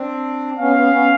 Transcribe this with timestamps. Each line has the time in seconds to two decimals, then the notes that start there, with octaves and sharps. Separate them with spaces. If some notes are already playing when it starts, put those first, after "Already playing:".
Already playing: C4 D4
0.59 B3 C#4 F5
0.70 C4
0.76 B3 C#4
0.92 B3 C#4